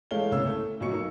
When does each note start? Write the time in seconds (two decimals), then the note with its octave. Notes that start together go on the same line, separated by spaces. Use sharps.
0.11 E3 G#3 A3 C#5 F5 G7
0.31 C2 C#3 A#3 C#5 E6
0.46 A3
0.80 B1 F#3 C#6 C#7
0.92 D#4 A#4 C#6